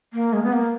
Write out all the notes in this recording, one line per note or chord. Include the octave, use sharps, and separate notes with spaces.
A#3
G#3
B3
A#3